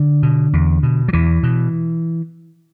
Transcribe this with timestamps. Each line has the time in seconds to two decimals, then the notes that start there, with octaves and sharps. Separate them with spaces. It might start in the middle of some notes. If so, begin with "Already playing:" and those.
Already playing: D3
0.23 B2
0.53 E2
0.83 B2
1.08 F#3
1.13 E2 E3
1.43 B2